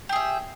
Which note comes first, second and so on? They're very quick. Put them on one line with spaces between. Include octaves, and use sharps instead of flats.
G4 G#4 E5